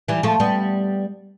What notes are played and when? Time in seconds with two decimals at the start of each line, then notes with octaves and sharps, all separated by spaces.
0.08 E3 G3
0.23 F3 A3
0.40 G3 B3